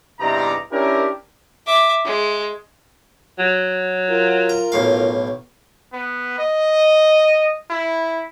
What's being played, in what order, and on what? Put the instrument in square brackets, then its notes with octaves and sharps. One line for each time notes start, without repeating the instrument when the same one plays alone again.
[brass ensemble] E2 G2 C3 D#4 D5 A#5
C#4 D4 E4 G4 A#4
[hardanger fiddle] E5 D6
G#3
[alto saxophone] F#3
[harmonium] F4 A#4
[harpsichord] A#5
B1 A2 F5
[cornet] B3
D#5
E4